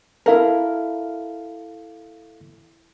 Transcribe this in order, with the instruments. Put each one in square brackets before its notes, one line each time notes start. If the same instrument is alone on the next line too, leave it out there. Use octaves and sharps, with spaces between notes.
[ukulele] E4 A#4 [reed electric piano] A4 F5